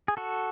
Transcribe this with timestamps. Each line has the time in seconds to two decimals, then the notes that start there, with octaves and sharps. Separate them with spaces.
0.08 G#4
0.17 F#4 A4